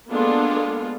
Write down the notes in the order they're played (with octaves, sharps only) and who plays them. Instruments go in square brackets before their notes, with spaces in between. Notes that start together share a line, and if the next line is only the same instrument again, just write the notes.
[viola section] G#3 A#3 B3 D4 F4 A4